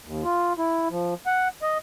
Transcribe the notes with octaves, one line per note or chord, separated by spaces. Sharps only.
D#2
F4
E4
F3
F#5
D#5